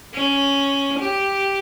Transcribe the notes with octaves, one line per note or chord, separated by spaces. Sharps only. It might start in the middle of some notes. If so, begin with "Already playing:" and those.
C#4
G4